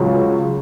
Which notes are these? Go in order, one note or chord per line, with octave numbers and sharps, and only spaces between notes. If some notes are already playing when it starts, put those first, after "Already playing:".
Already playing: C#2 C#3 F#3 C#4